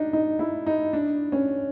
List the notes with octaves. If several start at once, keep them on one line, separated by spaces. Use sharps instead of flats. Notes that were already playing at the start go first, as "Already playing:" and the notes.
Already playing: D4 D#4
D#4
E4
D#4
D4
C#4